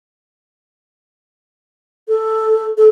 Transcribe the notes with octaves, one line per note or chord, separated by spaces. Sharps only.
A4
A4